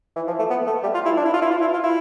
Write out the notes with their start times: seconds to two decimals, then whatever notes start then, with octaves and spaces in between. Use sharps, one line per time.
0.16 E3
0.27 F3
0.39 A3
0.50 B3
0.67 A3
0.83 G3
0.94 F4
1.05 E4
1.17 D4
1.25 E4
1.34 F4
1.42 E4
1.51 F4
1.61 E4
1.73 F4
1.83 E4